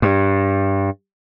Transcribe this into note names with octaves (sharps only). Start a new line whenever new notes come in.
G2